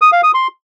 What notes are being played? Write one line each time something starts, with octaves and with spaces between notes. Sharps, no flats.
D#6
F5
D#6
C6